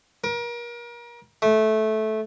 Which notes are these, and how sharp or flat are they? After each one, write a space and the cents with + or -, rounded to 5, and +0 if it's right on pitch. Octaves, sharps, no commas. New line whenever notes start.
A#4 +35
A3 -15